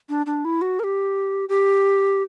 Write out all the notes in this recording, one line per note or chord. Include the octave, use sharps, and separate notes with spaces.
D4
D4
E4
F#4
A#4
G4
G4